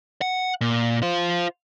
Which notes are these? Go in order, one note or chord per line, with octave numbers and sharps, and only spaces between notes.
F#5
A#2
F4 C5